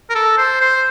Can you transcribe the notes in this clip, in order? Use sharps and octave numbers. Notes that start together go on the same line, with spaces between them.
A#4
A4
C5
C5